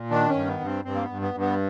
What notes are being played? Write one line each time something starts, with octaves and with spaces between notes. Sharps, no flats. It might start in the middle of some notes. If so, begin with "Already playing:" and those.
Already playing: A#2
D#3 D4
C#4
G2
B3
G2 C4
G2 C4
A#3
B3
G2
B3
G2
B3